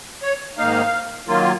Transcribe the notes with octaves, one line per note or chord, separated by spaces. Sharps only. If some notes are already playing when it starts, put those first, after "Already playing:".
C#5
G#2 D#3 A#3 D#4 F5
D#3 F#3 A#3 F4